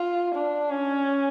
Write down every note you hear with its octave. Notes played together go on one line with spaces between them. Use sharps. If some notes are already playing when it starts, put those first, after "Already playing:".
Already playing: F4
D4
C#4